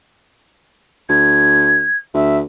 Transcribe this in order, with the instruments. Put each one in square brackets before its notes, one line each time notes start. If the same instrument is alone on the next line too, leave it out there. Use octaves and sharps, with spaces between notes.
[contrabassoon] D2 [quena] G#6
[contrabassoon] D2 [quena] E5